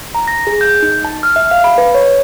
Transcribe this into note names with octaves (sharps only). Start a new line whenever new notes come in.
A#5
A#6
G#4
G6
D#4
A5
F6
E5
F5
B5
B4
C#5